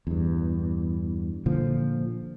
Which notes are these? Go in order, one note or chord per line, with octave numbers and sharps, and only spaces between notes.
E2 G2
A#2 D3 F3